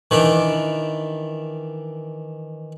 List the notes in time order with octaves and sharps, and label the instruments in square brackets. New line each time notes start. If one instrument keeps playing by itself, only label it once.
[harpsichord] D#3 E3 D4